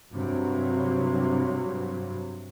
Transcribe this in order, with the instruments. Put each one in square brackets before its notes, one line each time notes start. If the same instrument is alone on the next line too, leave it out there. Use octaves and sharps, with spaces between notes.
[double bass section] G2 C3 F#3